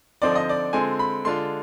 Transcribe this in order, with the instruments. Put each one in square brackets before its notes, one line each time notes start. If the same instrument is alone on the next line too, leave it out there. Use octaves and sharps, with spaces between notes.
[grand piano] D3 F3 C4 D#4 D5
D#5
D5
D3 G#3 C4 F4 G#5
B5
D3 G#3 D4 F4 C6